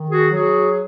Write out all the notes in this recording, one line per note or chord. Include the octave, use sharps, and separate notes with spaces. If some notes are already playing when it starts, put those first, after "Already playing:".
Already playing: D#3
F#4 G#4
F#3 F#4 G#4